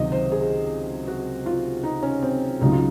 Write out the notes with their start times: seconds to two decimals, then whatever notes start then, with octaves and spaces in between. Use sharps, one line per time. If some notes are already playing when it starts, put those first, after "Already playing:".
Already playing: C#2 C3 D#3 F#3 D#5
0.12 C5
0.32 G#4
1.07 F#4
1.46 F4
1.83 D#4
2.03 C#4
2.23 C4
2.61 C#2 C#3 F#3 D#4
2.72 F4